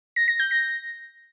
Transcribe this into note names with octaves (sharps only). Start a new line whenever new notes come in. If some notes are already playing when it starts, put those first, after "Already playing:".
A#6
A#6
G6
A#6